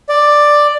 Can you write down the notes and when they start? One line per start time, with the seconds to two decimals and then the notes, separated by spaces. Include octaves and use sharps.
0.09 D5